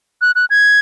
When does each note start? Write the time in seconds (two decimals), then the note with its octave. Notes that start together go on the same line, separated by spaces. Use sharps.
0.22 F#6
0.35 F#6
0.50 G#6